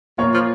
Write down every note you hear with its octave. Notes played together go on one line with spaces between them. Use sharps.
A#2 F3 A#3 F4 A#4 C#5
F3